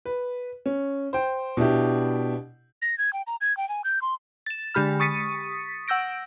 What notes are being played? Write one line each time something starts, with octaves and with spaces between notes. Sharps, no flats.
B4
C#4
C5 G5
B2 D4 E4 G4
A#6
G#6
G5
A#5
G#6
G5
G#5
G6
C6
A6 E7
D3 G#3 G4 B5 F6
C#6 D#6 A6 B6 C#7 D#7
F#5 E6 G6 A#6 D7